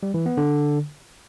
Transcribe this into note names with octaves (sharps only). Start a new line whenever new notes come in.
G3
E3
B3
D3